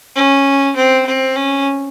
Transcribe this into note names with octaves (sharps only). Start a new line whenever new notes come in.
C#4
C4
C4
C#4